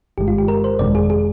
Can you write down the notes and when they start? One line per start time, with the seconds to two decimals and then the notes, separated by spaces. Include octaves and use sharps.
0.18 G1 G2 D#3 G#3 G4
0.28 F4
0.38 G4
0.48 A#4
0.64 C5
0.79 G1 F2 C3 D#3 G#3 D5
0.95 G#4
1.10 G#4